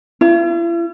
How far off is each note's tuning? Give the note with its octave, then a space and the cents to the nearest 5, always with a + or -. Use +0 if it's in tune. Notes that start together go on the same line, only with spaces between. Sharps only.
E4 +45